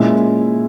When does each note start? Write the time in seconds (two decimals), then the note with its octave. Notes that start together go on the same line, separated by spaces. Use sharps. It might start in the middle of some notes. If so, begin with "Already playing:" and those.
Already playing: A#2 G#3 C#4 E4